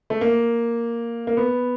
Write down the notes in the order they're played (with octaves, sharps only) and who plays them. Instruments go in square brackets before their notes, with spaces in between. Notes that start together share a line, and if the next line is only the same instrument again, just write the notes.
[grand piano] A3
A#3
A#3
B3